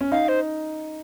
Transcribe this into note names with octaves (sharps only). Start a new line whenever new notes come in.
C#4
D#4 F5
C5